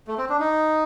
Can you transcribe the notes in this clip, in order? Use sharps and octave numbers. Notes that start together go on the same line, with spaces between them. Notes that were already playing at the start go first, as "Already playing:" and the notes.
A3
C4
D4
D#4